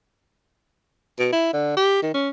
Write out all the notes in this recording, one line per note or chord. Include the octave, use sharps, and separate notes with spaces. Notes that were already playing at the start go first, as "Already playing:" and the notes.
B2
E4
D3
G4
D#3
C#4